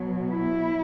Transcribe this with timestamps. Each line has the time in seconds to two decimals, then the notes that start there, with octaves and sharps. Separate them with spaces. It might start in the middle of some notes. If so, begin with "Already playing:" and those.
Already playing: B2 F#3
0.31 E4